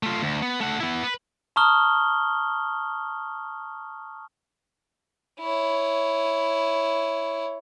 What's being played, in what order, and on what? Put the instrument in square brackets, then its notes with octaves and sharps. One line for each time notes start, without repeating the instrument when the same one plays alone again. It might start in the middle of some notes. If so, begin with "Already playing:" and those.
[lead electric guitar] A3 F4
D2
B3
A3 F#5
B3 E4
B4
[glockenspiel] A5 A#5 C#6 D#6 F6 G7
[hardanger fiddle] E4 C#5